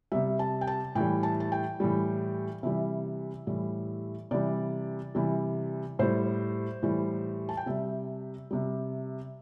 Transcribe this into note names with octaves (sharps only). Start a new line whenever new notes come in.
C3 G3 E5
A5
G5
A5
A2 E3 G3 G5
A5
A5
G5
A2 E3 G3
C3 E3 G3 E5
A2 E3 G3
C3 E3 G3 D5
C3 E3 G3
A2 G3 C5
A2 E3 G3
A5
G5
C3 G3 E5
C3 G3